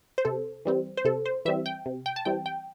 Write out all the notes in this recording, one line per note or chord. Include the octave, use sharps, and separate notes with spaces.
C5
C3 A4
E3 G3 C4
C5
C3 A4
C5
E3 G3 C4 E5
G5
C3
G5
A5
E3 G3 C4 G5
G5